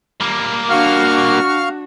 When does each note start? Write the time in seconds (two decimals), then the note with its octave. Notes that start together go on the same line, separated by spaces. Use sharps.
0.21 G3 A#3
0.70 D4 F#4 F5 C#6 F6